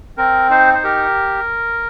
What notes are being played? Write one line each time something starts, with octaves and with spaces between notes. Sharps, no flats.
C4 A#4
D#4 C5
C5
G4 A#4